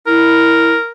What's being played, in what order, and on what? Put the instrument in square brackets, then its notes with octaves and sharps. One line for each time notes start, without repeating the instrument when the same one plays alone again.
[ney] E4 [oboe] A#4